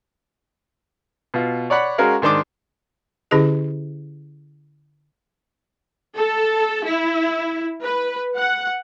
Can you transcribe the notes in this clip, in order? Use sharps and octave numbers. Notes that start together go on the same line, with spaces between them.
B2 F4
C#5 D5 F#5 B5 C#6
G#3 C#4 F#4 A#4 F5
G#2 D#3 D4 C6 D6
D3 C#4 E4 G4 G#4 D#5
A4
E4
B4
F#5